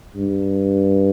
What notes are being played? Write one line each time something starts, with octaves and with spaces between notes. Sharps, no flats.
G2